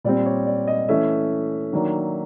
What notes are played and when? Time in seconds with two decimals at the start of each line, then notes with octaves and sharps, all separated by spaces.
0.04 A#2 G3 C4 D5
0.26 C#5
0.47 D5
0.68 D#5
0.89 E3 A3 C#4 E5
1.73 D#3 F#3 A#3 D4